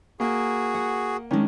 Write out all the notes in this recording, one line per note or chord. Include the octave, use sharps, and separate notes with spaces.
A#3 F#4 G#4
F#5
D#3 G#3 C#4 D4